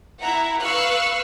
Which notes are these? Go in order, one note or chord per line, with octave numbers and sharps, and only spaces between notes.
E4 E5 F#5 A#5
B4 F5 C#6 E6 F#6 C#7